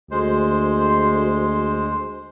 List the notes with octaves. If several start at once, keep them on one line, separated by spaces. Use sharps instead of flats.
D2 G#3 C5